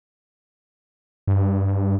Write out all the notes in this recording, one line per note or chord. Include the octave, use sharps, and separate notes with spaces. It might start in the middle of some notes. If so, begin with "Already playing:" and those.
G2